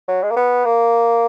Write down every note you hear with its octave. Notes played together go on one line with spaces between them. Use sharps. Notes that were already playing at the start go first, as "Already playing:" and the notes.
F#3
G#3
A#3
B3
A#3